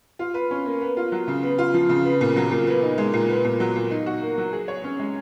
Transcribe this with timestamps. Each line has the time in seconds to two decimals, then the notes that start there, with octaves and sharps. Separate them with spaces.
0.19 F4
0.34 B4
0.51 C#4
0.66 A#3
0.81 B3
0.97 F4
1.12 F#3
1.28 C#3
1.43 B3
1.58 F4
1.74 F3
1.89 C#3
2.05 B3
2.21 A#2
2.36 F#3
2.52 A#2
2.67 B3
2.83 D#4
2.98 G#3
3.13 A#2
3.29 B3
3.44 A#2
3.60 F#3
3.76 A#2
3.91 D#4
4.06 F#4
4.22 A#3
4.38 F#3
4.53 G#4
4.68 C#5
4.84 C#4
4.99 G#3